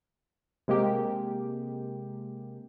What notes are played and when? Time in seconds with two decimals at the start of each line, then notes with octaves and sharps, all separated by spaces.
0.68 C3 G#3 A#3 G4